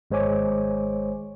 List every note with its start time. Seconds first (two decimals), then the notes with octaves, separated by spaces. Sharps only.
0.11 G#1 G#3 C5 C#5 G#5 D6